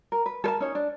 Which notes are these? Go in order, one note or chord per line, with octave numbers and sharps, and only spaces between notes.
A#4
B4
A4 A#4 A5
C#4 D#4 C#5
D4